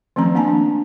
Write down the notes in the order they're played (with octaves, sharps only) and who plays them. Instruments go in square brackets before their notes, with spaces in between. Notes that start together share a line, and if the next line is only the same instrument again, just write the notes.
[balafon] D#3 F3 A3 C4 C#4 A#5
A#3 D4 G#5 A5
D4